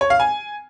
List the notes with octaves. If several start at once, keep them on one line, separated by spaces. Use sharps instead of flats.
C#5
F5
G#5